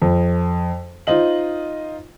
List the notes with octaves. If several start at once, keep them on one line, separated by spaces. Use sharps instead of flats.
F2
D#4 F4 C5 D#5 F#7